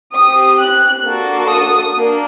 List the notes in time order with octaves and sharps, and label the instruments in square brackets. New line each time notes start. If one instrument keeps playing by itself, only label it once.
[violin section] C4 G4 D#6
F#6
A#3 D4 F#4 A4
D#6
A#3 D4